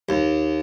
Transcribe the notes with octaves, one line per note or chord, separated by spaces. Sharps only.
D#2